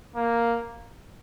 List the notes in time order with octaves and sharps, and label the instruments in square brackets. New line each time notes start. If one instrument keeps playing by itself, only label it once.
[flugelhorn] A#3